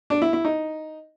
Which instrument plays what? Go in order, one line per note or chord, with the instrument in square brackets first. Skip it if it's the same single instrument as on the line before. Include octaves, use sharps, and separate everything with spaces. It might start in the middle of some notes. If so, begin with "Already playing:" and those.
[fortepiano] D4
E4
E4
D#4